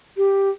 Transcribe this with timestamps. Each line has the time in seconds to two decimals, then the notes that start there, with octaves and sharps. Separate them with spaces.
0.17 G4